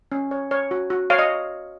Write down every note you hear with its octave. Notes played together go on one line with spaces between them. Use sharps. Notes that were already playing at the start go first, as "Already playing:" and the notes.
C#4
C#5
C#5
F#4
F#4
C#5 F5
D#5